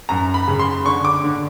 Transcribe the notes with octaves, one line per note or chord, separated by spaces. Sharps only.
F#2 A#5
B5
C#3
C6
D3 C#6
D6
D3